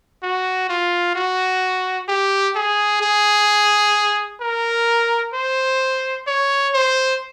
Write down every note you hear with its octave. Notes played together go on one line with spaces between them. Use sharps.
F#4
F4
F#4
G4
G#4
G#4
A#4
C5
C#5
C5